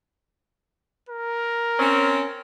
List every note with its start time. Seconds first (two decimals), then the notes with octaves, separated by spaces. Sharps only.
1.09 A#4
1.80 C4 C#4